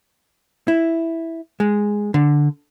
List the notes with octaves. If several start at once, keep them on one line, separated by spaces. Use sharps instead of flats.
E4
G#3
D3